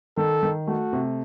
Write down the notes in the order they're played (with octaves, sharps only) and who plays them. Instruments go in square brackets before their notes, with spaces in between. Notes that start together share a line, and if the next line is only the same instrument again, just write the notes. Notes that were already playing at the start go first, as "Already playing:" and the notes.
[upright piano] D#3 [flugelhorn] A4
[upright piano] D#3
[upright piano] A3 [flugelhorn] F#4
[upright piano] C3